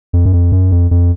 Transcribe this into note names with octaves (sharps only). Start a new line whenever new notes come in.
F2
F#2
F2
F#2
F2
F2